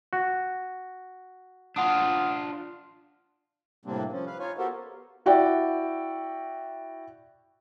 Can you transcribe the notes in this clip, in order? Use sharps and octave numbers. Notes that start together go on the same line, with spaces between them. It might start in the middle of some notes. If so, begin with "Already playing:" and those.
F#4
D4 F4 F#5 D#6
A2 C3 G3 A#3 C4 D4
F3 C#4
B4 F5
D#4 F4 C#5 F5 G#5
B3 F#4 G4 A4 A#4 C5
E4 F#4 D5 G5